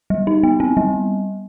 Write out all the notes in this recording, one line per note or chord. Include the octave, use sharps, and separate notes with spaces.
G3
D#4
B3
C4
G3